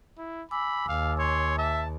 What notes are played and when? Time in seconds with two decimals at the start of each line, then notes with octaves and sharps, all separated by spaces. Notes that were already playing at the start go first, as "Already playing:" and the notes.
0.18 E4
0.51 G#5 B5 D6 E6
0.89 D#2 F5
1.19 C#5 C6
1.58 E5 A5